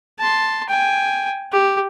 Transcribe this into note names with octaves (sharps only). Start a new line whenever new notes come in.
A5 C6
G5 G#5
G4